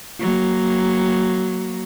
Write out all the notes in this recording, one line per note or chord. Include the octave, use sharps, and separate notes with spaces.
F#3 A#3